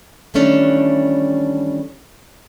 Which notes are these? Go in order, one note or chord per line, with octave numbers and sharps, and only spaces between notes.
D#3 E3 G3 A3 C#4 D4